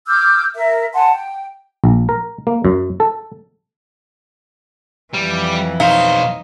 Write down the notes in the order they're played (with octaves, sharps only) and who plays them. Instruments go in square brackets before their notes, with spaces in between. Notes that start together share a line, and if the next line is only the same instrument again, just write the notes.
[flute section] D6 E6 F6 G6
A#4 E5
F#5 G#5 A5 C6
G5
[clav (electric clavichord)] A#1
A#4
A#3
F#2
A4
[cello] F2 E3 [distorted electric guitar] G3
[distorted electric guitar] B1 C5 [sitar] D#4 [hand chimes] F5